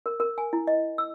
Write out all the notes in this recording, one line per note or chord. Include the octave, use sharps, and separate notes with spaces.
A#4
A#4
G#5
E4
D#5
E6